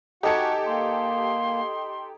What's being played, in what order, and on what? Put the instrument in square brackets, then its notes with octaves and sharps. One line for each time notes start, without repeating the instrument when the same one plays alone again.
[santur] D#4 G#5 [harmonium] F#4 F#5 [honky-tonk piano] G4 A4 C#7
[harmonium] A#3 [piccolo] C6